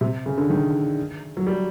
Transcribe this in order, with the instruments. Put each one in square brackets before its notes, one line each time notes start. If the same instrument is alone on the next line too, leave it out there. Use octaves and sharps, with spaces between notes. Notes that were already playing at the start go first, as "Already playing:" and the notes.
[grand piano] C3
C#3
D3
D#3
F#3
G3